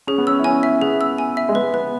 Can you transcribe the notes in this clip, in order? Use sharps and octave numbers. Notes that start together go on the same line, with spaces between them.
C#4 G#4
B3
C#4 E6
E4
C#4 G#5
E5
B3 G#4
E6
G#5
E5
G#3
B3 B4
B3 B4